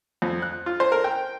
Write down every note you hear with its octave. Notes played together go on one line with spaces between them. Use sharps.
F2
F#6
F4
C5
A#4
G5